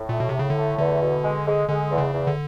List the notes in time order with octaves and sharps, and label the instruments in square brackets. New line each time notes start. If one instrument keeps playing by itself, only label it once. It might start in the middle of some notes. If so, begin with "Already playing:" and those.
Already playing: [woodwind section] A2
[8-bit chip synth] A#2 [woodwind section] A3
[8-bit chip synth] B2
C3
[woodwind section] A2 [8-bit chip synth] C#3
[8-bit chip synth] D3
[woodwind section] A3
[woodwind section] E2 [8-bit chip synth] D3
[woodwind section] B2
G#3
G#3
[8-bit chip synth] D3 [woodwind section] G#3
[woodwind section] E2
[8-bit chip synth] C#3
[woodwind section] E2
[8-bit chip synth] D3